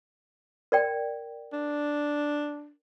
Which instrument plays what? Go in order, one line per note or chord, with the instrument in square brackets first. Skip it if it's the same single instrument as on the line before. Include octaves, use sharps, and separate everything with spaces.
[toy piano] A#4 D5 G5
[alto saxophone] D4